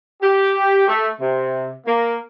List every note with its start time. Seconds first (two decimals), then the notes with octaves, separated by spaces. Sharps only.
0.22 G4
0.87 A3
1.19 C3
1.86 A#3